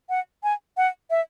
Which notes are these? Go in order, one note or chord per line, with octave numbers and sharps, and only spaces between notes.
F#5
G#5
F#5
E5